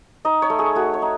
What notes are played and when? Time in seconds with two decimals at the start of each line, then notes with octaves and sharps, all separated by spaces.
0.25 D#4 D#5
0.42 C#5
0.50 A3
0.59 G#4
0.76 A3 F#4
0.94 C#5
1.02 D#4